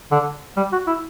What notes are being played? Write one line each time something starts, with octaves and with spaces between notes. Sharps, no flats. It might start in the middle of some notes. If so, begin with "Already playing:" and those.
D3
G3
F#4
E4